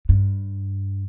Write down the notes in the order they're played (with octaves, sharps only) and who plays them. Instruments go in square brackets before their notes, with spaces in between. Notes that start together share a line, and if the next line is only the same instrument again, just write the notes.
[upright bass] G2